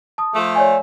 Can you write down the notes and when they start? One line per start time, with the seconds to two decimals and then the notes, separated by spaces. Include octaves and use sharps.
0.18 A5 D#6
0.35 F3 A3
0.55 C#5 D5 G#5